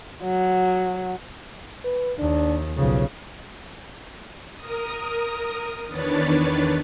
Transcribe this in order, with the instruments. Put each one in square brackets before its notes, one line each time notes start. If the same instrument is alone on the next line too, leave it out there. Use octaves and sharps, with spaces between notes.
[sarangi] F#3
[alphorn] B4
[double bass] D#2 [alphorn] D4
[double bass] B1 C#3 [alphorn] F3
[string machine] A#4 D#6
E2 D#3 D4 B4 C#5 A6